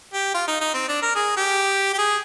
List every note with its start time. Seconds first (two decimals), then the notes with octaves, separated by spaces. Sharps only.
0.13 G4
0.34 F4
0.48 D#4
0.61 D#4
0.74 C4
0.89 D4
1.02 A#4
1.15 G#4
1.37 G4
1.93 G4
1.98 G#4